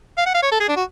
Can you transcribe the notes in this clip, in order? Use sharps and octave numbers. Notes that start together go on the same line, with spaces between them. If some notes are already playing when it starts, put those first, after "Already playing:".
F5
F#5
F5
C#5
A4
G#4
D4
F#4